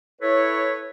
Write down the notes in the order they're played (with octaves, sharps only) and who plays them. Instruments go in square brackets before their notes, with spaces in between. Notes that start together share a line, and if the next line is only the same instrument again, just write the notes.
[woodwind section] E4 A4 B4 C#5